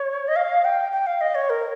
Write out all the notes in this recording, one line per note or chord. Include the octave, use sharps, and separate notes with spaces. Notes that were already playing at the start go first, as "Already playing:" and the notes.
Already playing: C#5
D#5
F5
G5
G5
F5
D#5
C#5
A#4